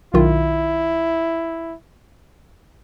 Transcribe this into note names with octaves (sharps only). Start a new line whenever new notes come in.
B1 D#3 E4 F4